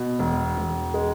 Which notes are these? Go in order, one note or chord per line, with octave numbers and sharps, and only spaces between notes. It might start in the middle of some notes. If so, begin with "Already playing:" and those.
Already playing: B2
E1
E1
G#3